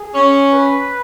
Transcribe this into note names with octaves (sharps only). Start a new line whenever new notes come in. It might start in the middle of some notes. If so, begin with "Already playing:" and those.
Already playing: G#4
C#4
B4